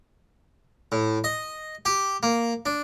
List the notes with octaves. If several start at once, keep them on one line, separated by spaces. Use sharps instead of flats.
A2
D#5
G4
A#3
D4